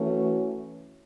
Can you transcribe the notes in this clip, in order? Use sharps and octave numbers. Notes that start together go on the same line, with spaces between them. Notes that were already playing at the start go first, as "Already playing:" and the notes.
Already playing: E3 A3 C#4 F#4